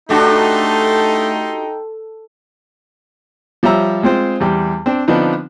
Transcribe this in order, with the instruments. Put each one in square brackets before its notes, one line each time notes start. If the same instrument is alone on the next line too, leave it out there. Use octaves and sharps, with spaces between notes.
[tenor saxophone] A3 [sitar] D4 F#4 G4 [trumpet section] D#4 G5 [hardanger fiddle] A4 C6
[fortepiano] F3 G3 C#5 E5 A#5 E6
G#3 C4 F4 C5
E2 G3
C4 D4
D3 F3 B3 C4 D4 D#4